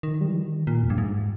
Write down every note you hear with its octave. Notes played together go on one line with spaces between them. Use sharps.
D#3
G3
E3
D#3
A#2
E2
G2
G#2